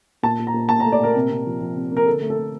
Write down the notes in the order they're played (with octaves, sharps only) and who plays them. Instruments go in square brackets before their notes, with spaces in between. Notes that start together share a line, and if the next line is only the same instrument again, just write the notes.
[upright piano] A#2 A5
A#2
A#5
A#2
A#2 A5
A#5
A3
D5
A#2 A#4
C3
C3
F3
F3
C3
A#3
A#4
D3 A4
A3
A4
A3